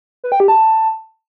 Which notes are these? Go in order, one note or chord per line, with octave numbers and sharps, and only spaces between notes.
B4
G5
G4
A5